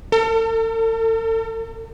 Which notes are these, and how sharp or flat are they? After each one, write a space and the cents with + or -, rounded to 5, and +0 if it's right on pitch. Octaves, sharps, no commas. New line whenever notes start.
A4 +45